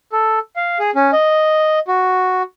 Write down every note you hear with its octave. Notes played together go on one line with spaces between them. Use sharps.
A4
F5
G#4
C#4
D#5
F#4